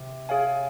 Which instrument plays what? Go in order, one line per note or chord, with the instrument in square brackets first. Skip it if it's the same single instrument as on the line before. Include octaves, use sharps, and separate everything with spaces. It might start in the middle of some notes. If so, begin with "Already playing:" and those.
Already playing: [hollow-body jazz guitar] C3
[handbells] G#4 C#5 F5 G#5